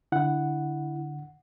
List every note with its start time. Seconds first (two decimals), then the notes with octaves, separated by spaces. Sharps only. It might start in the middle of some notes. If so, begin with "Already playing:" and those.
0.12 D3 E4 F#5